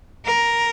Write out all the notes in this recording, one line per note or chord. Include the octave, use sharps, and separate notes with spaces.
A#4